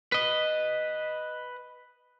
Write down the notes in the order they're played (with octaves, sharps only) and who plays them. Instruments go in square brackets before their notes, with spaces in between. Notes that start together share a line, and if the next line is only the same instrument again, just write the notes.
[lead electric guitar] B4 D#5